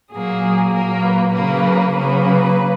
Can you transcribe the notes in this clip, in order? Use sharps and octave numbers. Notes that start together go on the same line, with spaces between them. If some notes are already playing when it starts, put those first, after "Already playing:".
A#2 F#3 A#3 G#4
A#2 F#3 A#3 A#4
B4
C#3 F#3 A#3 B4
C#3 F#3 A#3 B4